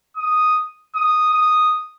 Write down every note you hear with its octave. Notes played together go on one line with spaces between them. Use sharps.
D#6
D#6
D#6